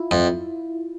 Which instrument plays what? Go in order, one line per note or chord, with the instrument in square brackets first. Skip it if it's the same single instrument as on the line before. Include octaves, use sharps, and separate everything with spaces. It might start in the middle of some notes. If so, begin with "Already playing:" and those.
Already playing: [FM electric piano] E4 F4
[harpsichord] F2